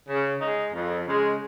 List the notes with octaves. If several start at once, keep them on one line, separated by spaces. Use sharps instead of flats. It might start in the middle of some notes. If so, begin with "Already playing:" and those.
C#3
G#3 D#4
F2
C#3 G#3